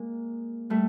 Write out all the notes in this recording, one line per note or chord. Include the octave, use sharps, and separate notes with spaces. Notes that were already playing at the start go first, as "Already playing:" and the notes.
Already playing: G#3 A#3
G3 A3